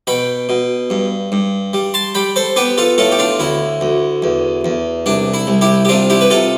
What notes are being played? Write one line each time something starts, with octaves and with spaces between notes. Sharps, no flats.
B2 G5 B5
B2
G2
G2
G3
A5 C6
G3 G5 B5
A4 C5
B3 G4 B4
F4 A4
A2 F4 A4
G4
D4 F4
D2 E4
D2
E2
E2
C2 D4
E4
C2
E4 G4
G4
C3 D4 F4
E4 G4
B4
C3 F4 A4